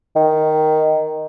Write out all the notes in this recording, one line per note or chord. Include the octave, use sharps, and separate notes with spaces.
D#3